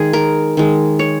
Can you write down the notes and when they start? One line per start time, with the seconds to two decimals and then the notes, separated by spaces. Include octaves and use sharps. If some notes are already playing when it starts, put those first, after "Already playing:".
Already playing: D#3 G#3 G#4
0.13 A#4
0.57 D#3 G#3
0.99 C#5